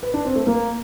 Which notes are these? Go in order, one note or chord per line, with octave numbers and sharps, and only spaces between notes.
B4
D4
C4
A3
A#3